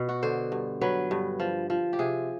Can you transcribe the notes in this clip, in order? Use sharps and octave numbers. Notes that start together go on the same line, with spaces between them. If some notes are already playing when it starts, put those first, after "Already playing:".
Already playing: B2
F#4
D3 C5
G2
F#3 B4
G2
F3
F3
G4
C3 G#4